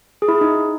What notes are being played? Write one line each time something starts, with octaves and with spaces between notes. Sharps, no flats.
G#4
E4
G#4
D#4